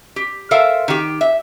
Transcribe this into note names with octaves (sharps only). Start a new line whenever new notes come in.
G4
A4 A#4 C5 E5 F5
D#3 G4
E5